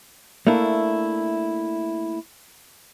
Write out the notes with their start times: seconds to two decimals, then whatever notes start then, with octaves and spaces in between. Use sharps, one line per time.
0.47 A3 A#3 D4 E4